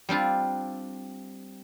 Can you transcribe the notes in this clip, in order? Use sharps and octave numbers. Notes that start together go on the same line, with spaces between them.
G3 C4 D4 F4